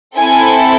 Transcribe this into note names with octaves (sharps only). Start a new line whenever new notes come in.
C4 E4 A4 G#5